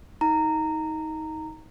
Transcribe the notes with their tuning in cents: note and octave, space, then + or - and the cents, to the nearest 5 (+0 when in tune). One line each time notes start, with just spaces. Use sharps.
D#4 +25 A#5 -15